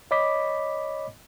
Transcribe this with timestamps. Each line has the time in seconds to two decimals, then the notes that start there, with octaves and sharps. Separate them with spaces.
0.11 C#5 D#5 B5 D6 B6